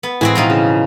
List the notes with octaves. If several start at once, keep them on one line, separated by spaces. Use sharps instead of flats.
B3
A2 E3 G#3 C4 E4 F#4 G#4
B2 F3 D#4
C#3